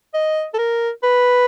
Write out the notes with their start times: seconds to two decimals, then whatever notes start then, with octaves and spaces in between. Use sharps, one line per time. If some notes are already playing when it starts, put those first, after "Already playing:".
0.14 D#5
0.54 A4
0.58 A#4
1.03 B4